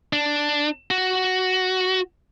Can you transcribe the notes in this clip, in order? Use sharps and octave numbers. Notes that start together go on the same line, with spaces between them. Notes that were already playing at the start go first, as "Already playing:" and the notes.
D4
F#4